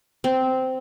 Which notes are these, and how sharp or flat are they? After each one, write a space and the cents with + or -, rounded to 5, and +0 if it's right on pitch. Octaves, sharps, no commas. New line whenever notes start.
C4 -10